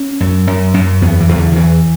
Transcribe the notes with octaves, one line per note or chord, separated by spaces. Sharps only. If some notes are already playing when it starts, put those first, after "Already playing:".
Already playing: C#4
F#2
F#2
F#2
E2 B3
E3
E2
D3
D3
E2 E3